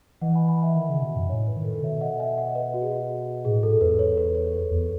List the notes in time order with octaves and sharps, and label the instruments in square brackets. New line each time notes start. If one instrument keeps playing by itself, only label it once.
[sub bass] E3 [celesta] D#5 F#5
[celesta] G#5 B5
G#5 B5
E5 G#5
[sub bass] D#3
C#3
B2
F#2
[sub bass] A2 [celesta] C#5
[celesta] B4
[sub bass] D#3
[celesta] A4
[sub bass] B2 [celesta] C#5 E5
[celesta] D#5 F#5
E5 G#5
D#5 F#5
B4 D#5
F#4
G#4
F#4
[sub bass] A2 [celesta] G#4
[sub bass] G#2 [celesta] A4
[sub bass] E2 [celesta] B4
[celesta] C#5
B4
C#5
[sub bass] E2